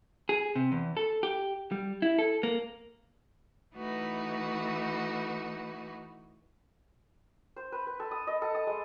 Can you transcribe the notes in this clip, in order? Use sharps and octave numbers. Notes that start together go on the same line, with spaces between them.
G#4
C3
E2
A4
G4
G3
E4
A4
A#3
E3 A3 D#4 F#4 B4
C5
B4
B4
A4
D#6
D#5
A4
D#6
G#3